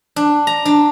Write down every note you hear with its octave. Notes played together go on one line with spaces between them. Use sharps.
D4
A#5
D4